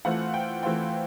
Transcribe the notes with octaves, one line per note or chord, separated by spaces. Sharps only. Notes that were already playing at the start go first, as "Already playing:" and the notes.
E3 A3 C4 F4 F#5
G5
E3 A3 C4 F4 G5